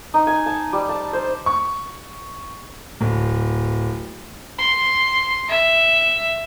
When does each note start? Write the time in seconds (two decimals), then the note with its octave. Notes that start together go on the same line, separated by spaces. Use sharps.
0.14 D#4
0.27 G#5
0.46 A5
0.73 G3
0.89 A5
1.13 C5
1.46 C#6
3.01 D1
4.58 C6
5.49 E5